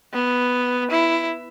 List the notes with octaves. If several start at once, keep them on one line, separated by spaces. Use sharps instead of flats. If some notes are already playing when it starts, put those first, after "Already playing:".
B3
E4